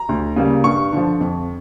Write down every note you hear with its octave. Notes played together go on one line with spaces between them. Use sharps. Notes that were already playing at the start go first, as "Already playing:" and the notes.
Already playing: A#5
D2
C#3 G3 A#3
G2 C#6
D3 F3
F2